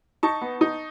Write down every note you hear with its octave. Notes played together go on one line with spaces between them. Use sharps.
D#4 A5 C#6
B3
D#4